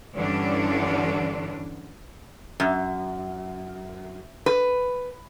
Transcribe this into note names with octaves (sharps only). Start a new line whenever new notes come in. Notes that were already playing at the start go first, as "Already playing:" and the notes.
G2 D3 E3 C#4 D4
F#2
B4